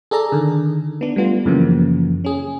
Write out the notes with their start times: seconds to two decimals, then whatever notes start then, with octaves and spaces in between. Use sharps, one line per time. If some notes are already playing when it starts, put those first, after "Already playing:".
0.11 G#4 A4 D5 A#5
0.32 D3 D#3
1.01 B3 D4
1.16 G3 A3 B3 F4
1.45 F#2 C#3 E3 F3 A#3
2.25 C#4 G#4